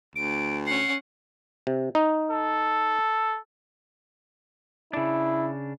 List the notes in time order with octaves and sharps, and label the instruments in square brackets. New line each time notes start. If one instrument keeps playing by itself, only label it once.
[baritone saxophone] D2 [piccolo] D7
[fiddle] C#4 F#5 [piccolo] C7
[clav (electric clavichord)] C3
D#4
[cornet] A4
[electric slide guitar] C#3 D4 [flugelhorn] E4